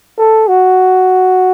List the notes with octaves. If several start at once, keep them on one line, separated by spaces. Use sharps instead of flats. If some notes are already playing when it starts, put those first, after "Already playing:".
A4
F#4